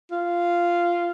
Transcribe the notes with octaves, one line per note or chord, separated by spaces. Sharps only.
F4